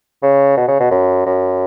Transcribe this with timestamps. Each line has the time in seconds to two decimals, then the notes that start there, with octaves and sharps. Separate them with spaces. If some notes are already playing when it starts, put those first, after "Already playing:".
0.23 C#3
0.57 B2
0.68 C#3
0.80 B2
0.91 F#2
1.26 F#2